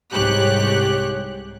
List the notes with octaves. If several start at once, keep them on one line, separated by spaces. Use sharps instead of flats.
C2 G#2 G4 C#5 F#6